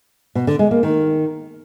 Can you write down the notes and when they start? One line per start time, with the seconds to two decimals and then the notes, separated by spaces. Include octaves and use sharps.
0.35 B2
0.47 D3
0.59 G#3
0.71 A#3
0.83 D#3